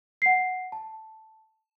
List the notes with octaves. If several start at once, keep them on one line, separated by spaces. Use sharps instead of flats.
F#5 C7
A5